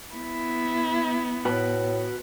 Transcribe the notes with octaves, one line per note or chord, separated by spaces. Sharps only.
B3 E4
A2 F#4 B4